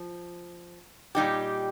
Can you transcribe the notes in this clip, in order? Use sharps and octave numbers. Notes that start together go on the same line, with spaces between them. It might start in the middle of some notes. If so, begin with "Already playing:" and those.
Already playing: F3
A#2 G3 D#4 G4